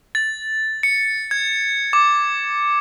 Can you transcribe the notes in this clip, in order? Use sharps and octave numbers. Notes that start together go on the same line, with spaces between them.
A6
C#7
G#6
D6